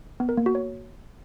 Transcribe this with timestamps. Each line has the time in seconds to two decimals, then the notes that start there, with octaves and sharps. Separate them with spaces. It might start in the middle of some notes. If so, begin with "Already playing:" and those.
0.20 B3
0.29 A#4
0.37 A#3
0.46 F#4
0.55 C#5